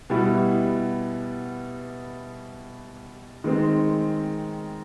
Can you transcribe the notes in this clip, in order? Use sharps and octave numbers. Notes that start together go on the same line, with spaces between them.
B2 G3 B3 E4
D#3 G#3 C4